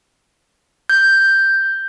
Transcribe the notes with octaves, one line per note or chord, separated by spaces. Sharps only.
G6